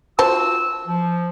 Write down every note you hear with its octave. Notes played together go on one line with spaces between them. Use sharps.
F4 F#4 C5 A5 E6
F3